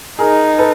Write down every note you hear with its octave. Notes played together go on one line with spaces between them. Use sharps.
D#4 G#4 A#4
A4 B4